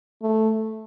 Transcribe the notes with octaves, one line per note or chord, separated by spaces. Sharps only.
A3